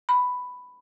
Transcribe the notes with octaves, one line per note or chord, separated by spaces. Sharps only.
B5